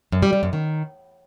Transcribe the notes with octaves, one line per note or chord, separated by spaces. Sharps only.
F#2
G3
G3
F#2
D#3